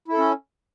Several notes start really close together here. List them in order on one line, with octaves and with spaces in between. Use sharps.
E4 A4 C#4